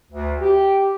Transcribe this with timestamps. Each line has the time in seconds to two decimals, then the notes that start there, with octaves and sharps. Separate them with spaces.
0.11 D2
0.40 G4